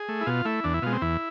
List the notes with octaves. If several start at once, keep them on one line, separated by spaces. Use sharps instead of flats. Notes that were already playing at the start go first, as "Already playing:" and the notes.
Already playing: G#4
A3
E4
B2 F4
A3 E4
E2 D4
E4
B2 G#3 F4
C4
E2 E4